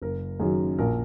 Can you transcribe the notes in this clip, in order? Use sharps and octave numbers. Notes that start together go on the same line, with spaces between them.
F#1 A#4
F#2 D#3 F#3 G#4
A#1 A#4